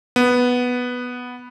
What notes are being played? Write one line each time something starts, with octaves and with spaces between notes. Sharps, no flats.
B3